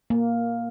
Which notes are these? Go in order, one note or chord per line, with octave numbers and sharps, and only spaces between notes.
A#3